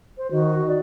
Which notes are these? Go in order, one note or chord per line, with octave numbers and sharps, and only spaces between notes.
C5
D#3 F#4
D5